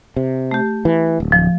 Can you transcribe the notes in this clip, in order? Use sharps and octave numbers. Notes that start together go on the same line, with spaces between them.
C3
A3 G4
E3
D1
F3